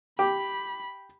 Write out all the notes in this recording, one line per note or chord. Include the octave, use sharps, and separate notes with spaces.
G4 B5